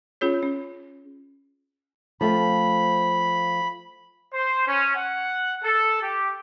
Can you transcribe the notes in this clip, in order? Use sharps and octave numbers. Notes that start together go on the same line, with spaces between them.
C#4 F4 G#4 C#5
C#4
F3 A3 C4 B5
C5
C#4
F#5
A4
G4